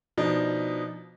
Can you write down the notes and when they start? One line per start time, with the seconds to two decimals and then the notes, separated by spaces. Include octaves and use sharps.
0.17 B2 F3 D4 D#4